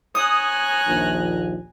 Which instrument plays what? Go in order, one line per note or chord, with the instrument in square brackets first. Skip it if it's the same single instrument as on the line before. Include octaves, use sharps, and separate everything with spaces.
[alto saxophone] C#5 [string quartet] G#5 A#5 F#6 [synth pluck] D#6
[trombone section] A#1 D#2